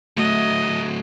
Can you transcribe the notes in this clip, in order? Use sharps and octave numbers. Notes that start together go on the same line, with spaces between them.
D2 F#3 A3 D#5